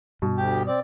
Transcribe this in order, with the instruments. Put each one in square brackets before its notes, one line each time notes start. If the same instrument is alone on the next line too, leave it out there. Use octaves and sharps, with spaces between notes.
[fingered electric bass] G2 [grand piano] B2
[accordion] D2 G4
C4 D5